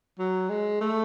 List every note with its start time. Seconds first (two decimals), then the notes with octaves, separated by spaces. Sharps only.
0.19 F#3
0.49 G#3
0.81 A3